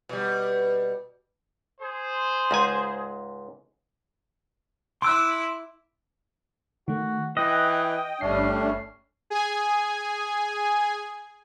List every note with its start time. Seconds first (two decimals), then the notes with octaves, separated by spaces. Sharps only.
0.09 B2 G3
1.81 G#4 C5
2.51 C#2 G#2 G#5
5.02 E4 C6 D6 E6 F#6
6.88 D#3 A3 F#4
7.37 E3 D#5 G5 F#6
8.21 G1 G3 A3 C#4 D4 C7
9.30 G#4 G#5